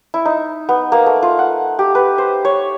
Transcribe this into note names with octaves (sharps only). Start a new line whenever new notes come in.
E4
D#4
B3
A#3
A3
F4
F#5
G4
B4
C5
C#5